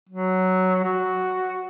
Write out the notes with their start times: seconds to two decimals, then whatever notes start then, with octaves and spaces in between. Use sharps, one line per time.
0.09 F#3
0.84 F#4